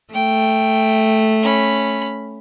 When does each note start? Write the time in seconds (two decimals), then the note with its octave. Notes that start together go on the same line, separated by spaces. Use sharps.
0.14 A3 G5
1.42 C#4 B5